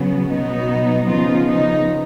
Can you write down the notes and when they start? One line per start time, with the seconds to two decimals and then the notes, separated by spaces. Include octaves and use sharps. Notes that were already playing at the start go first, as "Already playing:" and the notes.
Already playing: C#3 F#3 B3
0.29 B2 F#3 B3 D#4
1.07 C#3 F3 B3 D#4 F4
1.48 D#4